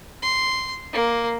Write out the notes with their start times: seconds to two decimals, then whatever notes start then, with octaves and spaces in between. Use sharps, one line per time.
0.22 C6
0.93 A#3